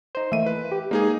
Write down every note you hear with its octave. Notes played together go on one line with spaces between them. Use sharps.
D#4 C5
E3 A3 A#3 E5 D#7
B4
G4
G#3 A#3 D#4 G#4